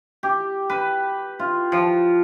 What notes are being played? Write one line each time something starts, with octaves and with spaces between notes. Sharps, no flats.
G4
B4
F4
F3